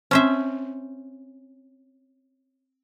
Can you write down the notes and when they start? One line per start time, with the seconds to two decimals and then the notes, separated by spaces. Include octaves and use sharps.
0.11 C4 C#4 C5 E5